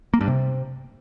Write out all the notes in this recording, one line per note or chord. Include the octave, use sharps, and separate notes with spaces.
A#3
G2
C3